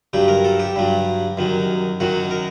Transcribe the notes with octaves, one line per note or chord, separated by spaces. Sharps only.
G2 F#3 G4
A#4
A4
G4
G2 F#3
F#2 D#3 F#3
F#2 D#3 F#3 F#4
A#4